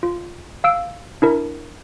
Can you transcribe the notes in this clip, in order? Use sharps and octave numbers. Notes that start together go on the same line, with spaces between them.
F4
F5 E6 D7
D4 E4 A#4